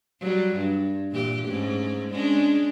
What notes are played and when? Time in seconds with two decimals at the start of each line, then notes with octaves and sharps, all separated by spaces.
0.20 F#3 G3
0.56 G2
1.11 A#2 E3 G4
1.48 G#2 A3 C#4
2.10 G#3 C#4 D4